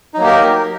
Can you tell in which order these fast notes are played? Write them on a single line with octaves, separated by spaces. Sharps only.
D#4 F#3 A#3 G4 A#4